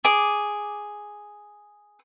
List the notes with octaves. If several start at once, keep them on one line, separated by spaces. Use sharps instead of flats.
G#4 D6